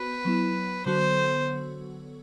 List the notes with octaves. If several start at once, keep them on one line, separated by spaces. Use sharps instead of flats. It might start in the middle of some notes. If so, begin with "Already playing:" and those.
Already playing: B3 F#4 B4 C5
F#3 B3 E4
D3 F#3 B3 F#4 A4 C5